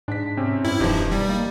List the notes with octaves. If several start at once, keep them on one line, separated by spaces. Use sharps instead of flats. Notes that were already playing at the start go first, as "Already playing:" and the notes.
G#2 D4 B6
C3 C4 C#4
G2 E4
E1 G2 F3 D#4 G4
G3
A#3